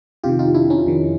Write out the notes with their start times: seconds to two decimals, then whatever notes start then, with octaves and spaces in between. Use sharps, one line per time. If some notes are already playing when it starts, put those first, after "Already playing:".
0.24 F2 C3 D#3 F4 G4
0.39 D#4 F4
0.54 D4 E4
0.70 C#4 D#4
0.86 F2 C3 D#3